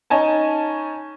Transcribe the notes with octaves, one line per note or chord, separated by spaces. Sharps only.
C#4 D#4 G#5 A5